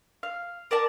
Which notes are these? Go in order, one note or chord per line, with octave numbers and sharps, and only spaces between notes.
F5
A#4 D5 A5